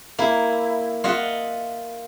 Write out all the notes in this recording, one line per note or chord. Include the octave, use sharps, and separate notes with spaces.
A#3 E4
F4 D#5 E5 F#5